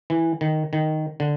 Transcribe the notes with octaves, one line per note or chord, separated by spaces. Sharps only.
E3
D#3
D#3
D3